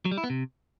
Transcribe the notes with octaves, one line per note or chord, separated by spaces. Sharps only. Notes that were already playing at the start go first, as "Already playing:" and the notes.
F#3
G3
E4
B3
C3